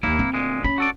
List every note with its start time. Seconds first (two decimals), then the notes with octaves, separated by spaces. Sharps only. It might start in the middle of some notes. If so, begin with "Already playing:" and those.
0.03 D#2 A#3 E4
0.19 C4
0.34 D2 A#2 G#3
0.64 C#4 B5
0.78 F#4 A4 D5